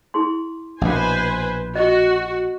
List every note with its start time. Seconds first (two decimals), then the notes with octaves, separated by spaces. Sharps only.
0.14 E4 G#4 C6
0.81 A#1 B2 B4 C5 G#5
1.76 F#4 D#5 C#6